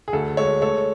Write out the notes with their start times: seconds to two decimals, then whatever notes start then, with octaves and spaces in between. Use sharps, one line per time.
0.08 G#4
0.13 D2 A4
0.37 G#3 A4 C#5
0.62 A3 A4 C#5